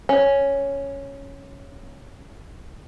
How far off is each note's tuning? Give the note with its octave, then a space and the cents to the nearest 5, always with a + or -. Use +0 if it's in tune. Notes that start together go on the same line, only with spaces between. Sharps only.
C#4 +0